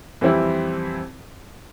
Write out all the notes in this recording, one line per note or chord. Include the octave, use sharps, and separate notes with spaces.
F2 E3 G3 C4 E4